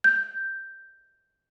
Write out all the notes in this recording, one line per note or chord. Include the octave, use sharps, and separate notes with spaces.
G6